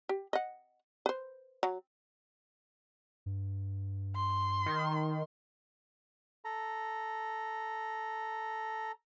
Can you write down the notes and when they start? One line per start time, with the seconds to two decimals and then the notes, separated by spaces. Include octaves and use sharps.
0.09 G4
0.33 D#5 F#5
1.06 B4 C5
1.63 F#3
3.26 G2
4.16 C6
4.66 D#3
6.45 A4 A#5